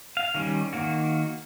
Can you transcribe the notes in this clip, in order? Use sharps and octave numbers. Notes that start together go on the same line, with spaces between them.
F5
D#3 G3 C#4
D#3 A#3 F#4